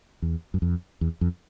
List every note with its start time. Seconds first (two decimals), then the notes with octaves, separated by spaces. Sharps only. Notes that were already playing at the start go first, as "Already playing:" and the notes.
0.22 E2
0.54 F#2
0.62 F2
1.01 E2
1.21 F2